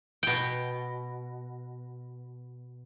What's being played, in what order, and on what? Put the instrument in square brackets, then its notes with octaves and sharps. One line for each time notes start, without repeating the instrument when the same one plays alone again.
[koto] B2 G5